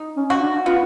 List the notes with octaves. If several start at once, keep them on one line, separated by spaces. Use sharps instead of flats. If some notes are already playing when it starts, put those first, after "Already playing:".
Already playing: D#4
C#4
F#4
D4
B3 F4